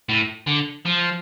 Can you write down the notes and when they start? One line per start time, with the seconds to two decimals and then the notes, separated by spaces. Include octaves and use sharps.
0.09 A2
0.47 D3
0.85 F3